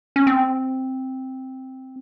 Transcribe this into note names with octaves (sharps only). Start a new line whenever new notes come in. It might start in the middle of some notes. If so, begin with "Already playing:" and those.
C#4
C4